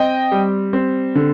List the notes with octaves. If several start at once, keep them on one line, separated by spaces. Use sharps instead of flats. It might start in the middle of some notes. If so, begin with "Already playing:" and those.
Already playing: C4 D#5 G5
G3
C4
D3